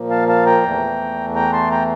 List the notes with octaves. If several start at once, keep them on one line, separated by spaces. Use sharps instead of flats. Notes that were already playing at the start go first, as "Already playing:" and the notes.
Already playing: A#2 F3 A#3
F5 A5
F5 A5
G5 A#5
E2 E3 A3
G5 A#5
A5 C6
G5 A#5